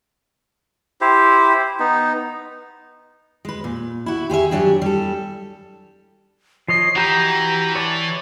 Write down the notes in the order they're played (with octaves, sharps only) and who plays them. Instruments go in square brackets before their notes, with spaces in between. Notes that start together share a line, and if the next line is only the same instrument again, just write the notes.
[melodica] E4 G4 C5
B3 D#4
[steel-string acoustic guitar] G#3 B4
A#2
E4 F#4
G4 G#4 C5 E5
G2 C#3 F#3 D4 G4 G#4
G3 A4
[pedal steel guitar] F3 C#5 D#5 [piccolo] C7
[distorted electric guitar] E3 [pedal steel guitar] F#4 G4 G5 [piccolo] A#5
[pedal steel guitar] C#5 D5 A5